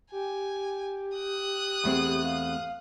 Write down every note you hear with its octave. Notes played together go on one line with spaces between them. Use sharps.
G4 G#5
D#6 F#6
E2 A3 C4
F5